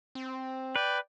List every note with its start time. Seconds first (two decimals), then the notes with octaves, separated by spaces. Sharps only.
0.15 C4
0.76 B4 D5 G5